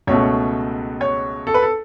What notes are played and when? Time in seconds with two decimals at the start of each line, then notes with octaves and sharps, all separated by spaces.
0.07 C#2 B2 A3 C#5
1.01 C#5
1.47 A4
1.54 B4
1.62 A4